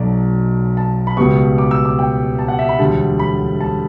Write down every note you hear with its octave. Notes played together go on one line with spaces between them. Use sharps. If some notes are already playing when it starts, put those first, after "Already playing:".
Already playing: B1 B2 F#3 D5
A5
B5
C#2 B2 G3 B3 C#6
D6
E6
D6
G5
A5
F#5
E5
B5
E1 D2 D3 G3 A5
B5
A5